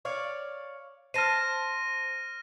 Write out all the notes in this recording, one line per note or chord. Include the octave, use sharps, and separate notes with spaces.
C#5 D5 F5
C5 A5 F6 A#6 D#7